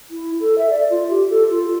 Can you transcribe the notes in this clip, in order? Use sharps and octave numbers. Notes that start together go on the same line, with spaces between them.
E4
A4
E5
D5
F4
G4
A4
F4